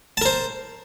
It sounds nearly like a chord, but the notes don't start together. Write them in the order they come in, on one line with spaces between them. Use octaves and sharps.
A5 A#4 C5